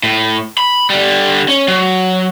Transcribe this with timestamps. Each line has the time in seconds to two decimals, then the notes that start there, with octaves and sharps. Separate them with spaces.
0.03 A2
0.57 B5
0.90 D3 G3
1.48 C#4
1.68 F#3